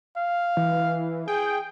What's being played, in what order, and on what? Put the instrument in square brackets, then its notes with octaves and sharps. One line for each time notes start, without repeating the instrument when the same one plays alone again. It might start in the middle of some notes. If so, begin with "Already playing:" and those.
[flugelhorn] F5
[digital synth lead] E3
[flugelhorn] G#4 [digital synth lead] G5